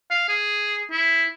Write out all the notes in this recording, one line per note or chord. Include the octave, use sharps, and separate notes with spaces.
F5
G#4
E4